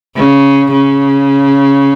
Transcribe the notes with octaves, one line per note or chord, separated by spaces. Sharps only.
C#3
C#3